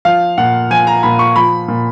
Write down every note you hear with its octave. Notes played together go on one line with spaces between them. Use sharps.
F3 F5
A#2 F#5
F3 G#5
A#5
A#2 B5
C#6
F3 B5
A#2